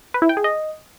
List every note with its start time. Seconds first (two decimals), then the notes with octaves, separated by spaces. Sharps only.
0.14 B4
0.22 E4
0.29 G5
0.37 G#4
0.44 D#5